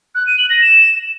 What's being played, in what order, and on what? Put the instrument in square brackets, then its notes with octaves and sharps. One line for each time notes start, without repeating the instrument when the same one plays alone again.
[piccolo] F#6
D#7
F#7
A#6
E7